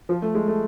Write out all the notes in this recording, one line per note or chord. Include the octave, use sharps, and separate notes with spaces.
F3
A3
G#3
A3